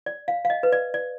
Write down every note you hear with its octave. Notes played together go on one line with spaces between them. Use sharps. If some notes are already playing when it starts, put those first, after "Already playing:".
D5
F5
F5
D#5
B4
D5
D5